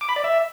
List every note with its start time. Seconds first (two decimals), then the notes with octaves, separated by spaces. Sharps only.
0.01 D6
0.09 B5
0.16 D5
0.24 E5